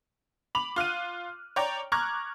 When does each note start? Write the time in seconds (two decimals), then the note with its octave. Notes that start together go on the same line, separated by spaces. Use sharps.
0.55 B5 D6 F7 F#7
0.76 F4 F6 F#6 D#7
1.56 C#5 D5 G5 A#5
1.92 A#5 C#6 D6 F6 F#6 G#6